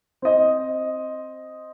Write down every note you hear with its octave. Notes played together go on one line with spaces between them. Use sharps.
C4 D#5